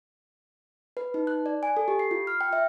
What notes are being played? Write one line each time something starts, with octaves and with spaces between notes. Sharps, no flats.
B4
D#4
F#6
D5
G#5
A4
G4
C7
F4
F6
G5
E5